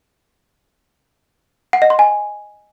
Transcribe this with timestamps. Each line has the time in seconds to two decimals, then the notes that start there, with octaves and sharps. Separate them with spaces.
1.73 F#5
1.82 D#5
1.90 C6
1.99 G#5